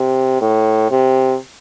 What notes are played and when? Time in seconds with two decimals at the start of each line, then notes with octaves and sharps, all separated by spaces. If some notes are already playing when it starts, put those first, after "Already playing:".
Already playing: C3
0.41 A2
0.91 C3